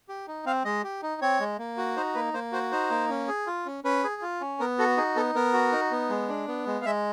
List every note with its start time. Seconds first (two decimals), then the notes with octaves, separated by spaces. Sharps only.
0.09 G4
0.28 D#4
0.46 C4 F5
0.65 G#3 D#5
0.84 G4
1.02 D#4
1.22 C4 C#5
1.40 G#3
1.59 A#3
1.77 F#4
1.96 D#4 C5
2.15 A#3 B4
2.34 A#3 C5
2.52 F#4 C5
2.71 D#4 C5
2.90 A#3
3.10 C#4
3.28 G#4
3.47 F4
3.66 C#4
3.84 C#4 B4
4.04 G#4
4.22 F4
4.41 C#4
4.60 B3 A#4
4.78 F#4 A4
4.97 D#4 G#4
5.16 B3 A4
5.35 B3 A#4
5.53 F#4
5.72 D#4
5.91 B3
6.09 G#3
6.28 D4
6.48 B3
6.66 G#3
6.81 F5
6.85 G#3 E5